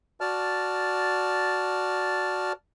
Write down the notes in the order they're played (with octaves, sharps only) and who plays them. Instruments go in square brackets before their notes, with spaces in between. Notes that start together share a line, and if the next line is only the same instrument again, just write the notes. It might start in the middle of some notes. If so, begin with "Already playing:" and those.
[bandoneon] F#4 D5 A5 F6